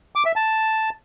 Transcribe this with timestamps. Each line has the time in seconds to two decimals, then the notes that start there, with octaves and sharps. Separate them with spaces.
0.16 D6
0.26 E5
0.36 A5